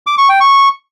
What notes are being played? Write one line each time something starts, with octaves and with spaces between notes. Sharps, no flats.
D6
C#6
G5
C#6